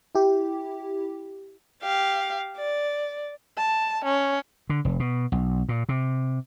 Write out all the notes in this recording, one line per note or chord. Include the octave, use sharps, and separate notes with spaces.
E4 G4
G4 F5
D5
A5
C#4
D3
F1
B2
B1
A#2
C3